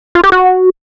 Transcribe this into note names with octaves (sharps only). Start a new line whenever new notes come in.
F4
G4
F#4